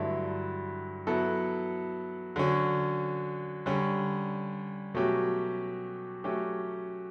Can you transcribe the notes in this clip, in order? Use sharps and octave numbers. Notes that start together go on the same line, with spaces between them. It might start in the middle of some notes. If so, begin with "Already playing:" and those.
Already playing: G2 D3 F#3 A3 E4
F#3 B3 E4 A4
D3 F#3 C#4
D3 G3 C#4
B2 F#3 A3 C#4 G4
F#3 A3 C#4 G4